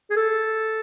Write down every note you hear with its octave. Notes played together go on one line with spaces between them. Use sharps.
G#4
A4